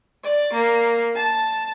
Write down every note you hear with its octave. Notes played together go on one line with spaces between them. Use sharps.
D5
A#3
A5